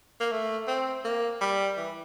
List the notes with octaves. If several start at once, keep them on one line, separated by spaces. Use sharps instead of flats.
A#3
A3
C4
A#3
G3
E3